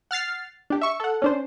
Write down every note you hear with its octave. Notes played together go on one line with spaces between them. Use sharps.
F#5 F6 A6 C7
D4 G4
E5 C#6
A4 F#5
C#4 D4 C5